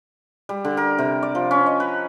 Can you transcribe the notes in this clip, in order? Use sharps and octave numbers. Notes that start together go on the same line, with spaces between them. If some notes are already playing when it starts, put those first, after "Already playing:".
G3
D3
A#4
C3
D5
F3
C#4
D#5
B4